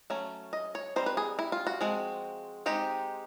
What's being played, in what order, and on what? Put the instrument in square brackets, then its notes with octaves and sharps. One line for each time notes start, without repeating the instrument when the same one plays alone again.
[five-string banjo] F#3 A3 C#4
D#5
C#5
G3 C4 D#4 C5
B4
G#4
E4
F4
F#4
F3 G#3 C4
G#3 C4 D#4 G4